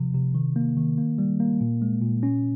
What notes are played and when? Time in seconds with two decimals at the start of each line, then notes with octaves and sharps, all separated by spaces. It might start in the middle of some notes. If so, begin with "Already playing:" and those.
Already playing: C3 F3
0.15 C3
0.35 D#3
0.56 A#3
0.77 D#3
0.98 A#3
1.18 G3
1.40 A#3
1.61 A#2
1.82 G#3
2.02 A#2
2.23 C#4